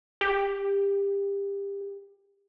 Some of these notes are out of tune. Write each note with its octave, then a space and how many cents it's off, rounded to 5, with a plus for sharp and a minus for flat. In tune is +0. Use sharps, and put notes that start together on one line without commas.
G4 +25